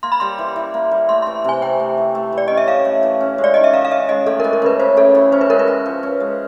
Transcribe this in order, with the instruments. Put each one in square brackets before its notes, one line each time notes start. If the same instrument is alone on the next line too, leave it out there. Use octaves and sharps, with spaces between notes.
[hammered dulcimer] A#3 [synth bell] C6
[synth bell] B5
[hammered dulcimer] G3 [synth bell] C6
[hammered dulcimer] E3
E3
A#3
G3
[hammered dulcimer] A3 [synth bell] C6
[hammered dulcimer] E3 [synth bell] C6
[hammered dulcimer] C3 [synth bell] G#5
[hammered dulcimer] C3 [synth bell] G5
[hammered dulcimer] A3
E3
A3
E3
[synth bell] D5
[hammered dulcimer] C#4 [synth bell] D#5
[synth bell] E5
[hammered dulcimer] A2 [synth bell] F5
[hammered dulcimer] A3
E3
C#4
G#3
[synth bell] D5
[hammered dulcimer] D#3 [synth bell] D#5
[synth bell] E5
[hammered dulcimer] D#3 [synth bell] F5
[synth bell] F5
[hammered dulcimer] C#4 [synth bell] E5
[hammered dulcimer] G#3 [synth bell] D#5
[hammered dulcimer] A3 [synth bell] A4
[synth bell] A#4
[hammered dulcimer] E3
[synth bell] A#4
[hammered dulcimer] C#3 [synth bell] B4
[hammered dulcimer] C#3 [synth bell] C5
[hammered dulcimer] A3 [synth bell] A4
[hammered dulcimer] E3
[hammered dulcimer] C#4 [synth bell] C5
[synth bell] B4
[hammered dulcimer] G#3 [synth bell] A#4
[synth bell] B4
[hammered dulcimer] F#4
F3
C#4
G#3